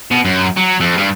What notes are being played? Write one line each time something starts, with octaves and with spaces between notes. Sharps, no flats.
B2
F#2
F#3
F2
G2